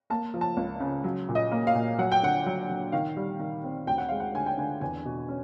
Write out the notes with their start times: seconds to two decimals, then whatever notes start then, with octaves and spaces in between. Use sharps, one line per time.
0.10 A#3 A5
0.34 F3
0.41 A5
0.57 C#2
0.80 C#3
1.04 F#3
1.28 A#2
1.35 D#5
1.51 A#3
1.67 F5
1.75 A#2
1.98 F#3 F#5
2.12 G5
2.23 D3 F#5
2.46 F#3
2.69 F#3
2.92 D#3 F5
3.17 G3
3.39 D#3
3.64 C4
3.87 D2 G5
3.98 F#5
4.09 G#3 F5
4.20 F#5
4.35 D3 G#5
4.46 G5
4.58 D3 G#5
4.81 E2 G#5
5.05 B2
5.28 C#4